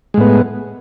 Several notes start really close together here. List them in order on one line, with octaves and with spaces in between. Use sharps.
G#3 A2 B3